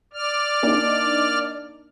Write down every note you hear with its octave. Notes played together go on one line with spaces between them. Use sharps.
D5 F6
A#3 D4 D#4